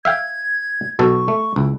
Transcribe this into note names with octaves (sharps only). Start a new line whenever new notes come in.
E5 F5 G5 G#6
B1 B2 A4 C#6
A3
C#2 E4